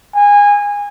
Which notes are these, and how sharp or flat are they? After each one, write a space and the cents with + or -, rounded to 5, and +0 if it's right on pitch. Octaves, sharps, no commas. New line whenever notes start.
G#5 -20